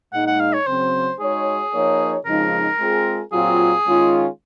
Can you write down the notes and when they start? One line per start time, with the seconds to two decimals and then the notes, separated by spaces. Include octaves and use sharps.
0.13 A#2 G#3 D#4 F#5
0.27 F#5
0.40 F5
0.53 C#5
0.67 C#3 F#3 C4 C5
1.20 G#3 D#4 F#4 G#4 C#5
1.73 F3 A#3 D#4 A#4 C#5
2.26 F2 C#3 F3 G#3 D#4 A#4
2.80 G#3 C4 F4 G#4
3.32 A#2 F#3 C4 F4 G#4
3.85 D#3 G#3 C#4 F4